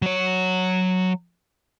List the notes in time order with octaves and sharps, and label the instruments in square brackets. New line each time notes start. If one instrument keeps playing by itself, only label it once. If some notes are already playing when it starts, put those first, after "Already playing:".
[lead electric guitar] F#3 C#5